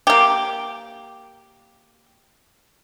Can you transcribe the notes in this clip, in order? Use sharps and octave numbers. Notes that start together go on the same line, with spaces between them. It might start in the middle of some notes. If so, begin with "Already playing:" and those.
A#3 G4